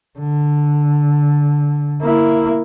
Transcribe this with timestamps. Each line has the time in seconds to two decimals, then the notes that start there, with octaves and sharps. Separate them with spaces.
0.19 D3
2.02 A#3 E4